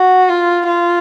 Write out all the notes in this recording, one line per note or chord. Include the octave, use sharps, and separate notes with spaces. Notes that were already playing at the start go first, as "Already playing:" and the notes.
Already playing: F#4
F4
F4